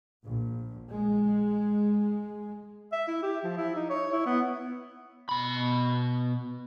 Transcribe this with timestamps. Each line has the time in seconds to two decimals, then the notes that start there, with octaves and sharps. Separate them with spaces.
0.21 A#1
0.89 G#3
2.92 E5
3.08 E4
3.23 G4
3.44 F3
3.57 E4
3.75 D#4
3.90 C#5
4.12 E4
4.26 B3
5.29 B2 B5